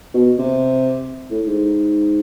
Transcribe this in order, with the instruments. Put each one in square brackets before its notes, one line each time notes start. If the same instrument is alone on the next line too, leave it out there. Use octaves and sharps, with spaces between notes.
[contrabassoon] B2
C3
A2
G#2